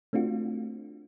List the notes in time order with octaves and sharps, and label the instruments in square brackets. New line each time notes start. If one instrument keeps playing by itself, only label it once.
[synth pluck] A3 C4 D4 F4 F#4